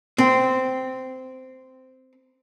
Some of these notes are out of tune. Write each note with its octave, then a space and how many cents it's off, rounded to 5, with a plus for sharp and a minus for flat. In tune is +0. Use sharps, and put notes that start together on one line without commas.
C4 -10